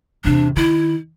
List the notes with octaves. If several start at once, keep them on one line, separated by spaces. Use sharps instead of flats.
E2 C3 D4
D#3 E4